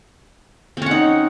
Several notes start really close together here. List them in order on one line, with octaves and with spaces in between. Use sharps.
C4 C#4 F#5 D#4